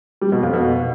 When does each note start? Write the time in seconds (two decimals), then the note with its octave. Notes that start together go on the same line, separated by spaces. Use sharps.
0.21 G3
0.32 B2
0.43 F2
0.53 B2